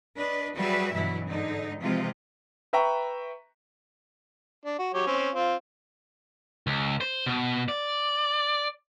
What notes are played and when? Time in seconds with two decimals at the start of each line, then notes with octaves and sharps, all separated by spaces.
0.15 D4 B4 D#5
0.55 F#3 G3 F#4 G#4 B4 E5
0.93 G2 B2 E3 F#3 E4
1.29 G#2 D3 D#4
1.81 C3 E3 F3 G#3 F4
2.73 B4 E5 G5 A#5 C#6
4.65 D4
4.79 F#4
4.94 F#3 G4 C#5
5.07 C4 C#4
5.34 C4 F4
6.67 C#2
7.01 C5
7.26 B2
7.68 D5